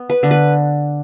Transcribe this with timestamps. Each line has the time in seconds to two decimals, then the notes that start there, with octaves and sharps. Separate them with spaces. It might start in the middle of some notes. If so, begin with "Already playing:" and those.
Already playing: B3
0.10 B4
0.23 D3
0.31 B4